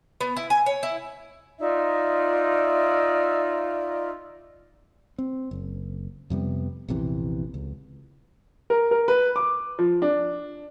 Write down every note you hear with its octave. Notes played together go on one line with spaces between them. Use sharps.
B3
E4
G#5
C#5
E4
D#4 F4 D5 E5
C4
F#1
F2 C3 G3 B3
A#1 E2 C3 E3
C#2
A#4
A#4
B4
D6
F3
D4